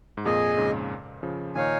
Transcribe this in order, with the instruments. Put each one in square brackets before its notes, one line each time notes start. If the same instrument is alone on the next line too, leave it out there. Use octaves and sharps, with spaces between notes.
[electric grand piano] G#2
[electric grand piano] F2 A#2 [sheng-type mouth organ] G#4 D#5 G#5
[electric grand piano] G#2 C#3
C#3 F3
[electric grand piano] A#2 D#3 [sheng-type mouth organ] D#4 C#5 F5 G#5